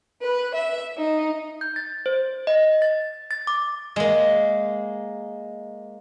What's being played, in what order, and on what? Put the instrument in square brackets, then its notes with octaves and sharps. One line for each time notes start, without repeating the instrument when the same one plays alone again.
[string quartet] B4
E5
D#4
[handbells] G6
A6
C5
D#5
A6
A6
D6
[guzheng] G#3 A#3